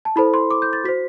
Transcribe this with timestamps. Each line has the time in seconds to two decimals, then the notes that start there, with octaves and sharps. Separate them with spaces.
0.05 A5
0.16 E4 A4 C5 B5
0.34 C6
0.50 D6
0.62 G6
0.73 A6
0.84 F#4 B6
0.88 C5